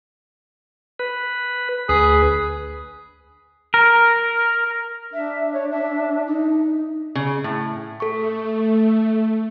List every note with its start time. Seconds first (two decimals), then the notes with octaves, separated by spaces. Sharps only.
0.99 B4
1.89 D2 G#4 B4
3.74 A#4
5.13 D4 E5
5.53 C#5
5.71 E5
6.26 D#4
7.15 C#3
7.44 A2
8.00 A3 A4 C#6